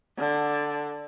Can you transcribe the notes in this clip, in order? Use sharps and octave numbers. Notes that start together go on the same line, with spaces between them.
D3